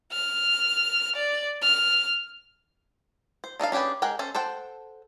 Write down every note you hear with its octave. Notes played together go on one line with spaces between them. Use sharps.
F6
D5
F6
C5
D4 D#4 A4 F5
C#4 D4 G4 G#4 B4
G#3 G#4 A#4 F#5 G5
C#4 A4 C5
A4 C5 F#5 G5